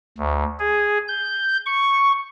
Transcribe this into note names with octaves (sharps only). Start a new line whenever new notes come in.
D2
G#4
G6
C#6